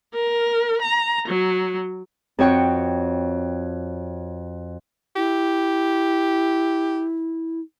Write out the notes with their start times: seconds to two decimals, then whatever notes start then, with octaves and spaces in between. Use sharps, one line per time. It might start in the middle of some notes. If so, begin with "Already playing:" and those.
0.13 A#4
0.81 A#5
1.27 F#3
2.39 F2 F#4 C#5 G5 C#6
5.16 E4 G4